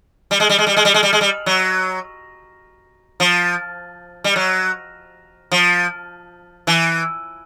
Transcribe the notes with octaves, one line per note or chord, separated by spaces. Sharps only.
G3
G#3
G3
G#3
G3
G#3
G3
G#3
G3
G#3
G3
F#3
F3
G3
F#3
F3
E3